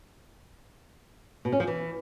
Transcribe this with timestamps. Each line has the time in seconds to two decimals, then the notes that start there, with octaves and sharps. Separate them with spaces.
1.45 B2
1.52 C#4
1.60 F3
1.67 E3